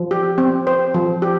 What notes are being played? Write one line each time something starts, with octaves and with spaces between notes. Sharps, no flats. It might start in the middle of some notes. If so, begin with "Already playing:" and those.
Already playing: F3
G4
C4
C5
F3
G4